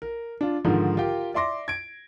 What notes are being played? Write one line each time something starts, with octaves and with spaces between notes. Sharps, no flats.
A#4
D4 F4
G#2 D3 D#3 F3
F4 G4 A#4 G5
D5 E5 C6 D6 A#6
G#6 D7